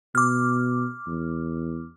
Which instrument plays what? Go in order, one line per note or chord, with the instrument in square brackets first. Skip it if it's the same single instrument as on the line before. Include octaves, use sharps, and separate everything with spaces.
[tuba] B2 [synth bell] D6 F6
[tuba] E2